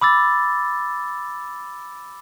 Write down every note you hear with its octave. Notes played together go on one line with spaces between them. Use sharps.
B5 D6 E6 A6